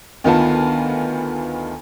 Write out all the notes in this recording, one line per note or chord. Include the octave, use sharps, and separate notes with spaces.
D2 D#3 B3 F4 B4 A5